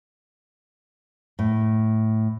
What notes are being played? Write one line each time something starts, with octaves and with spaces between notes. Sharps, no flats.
A2